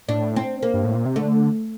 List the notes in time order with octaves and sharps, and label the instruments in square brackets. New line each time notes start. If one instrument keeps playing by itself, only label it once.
[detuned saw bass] A2 [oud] D4
[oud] C4
A#3
[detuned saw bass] G2
A2
A#2
C3
[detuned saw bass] D3 [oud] A3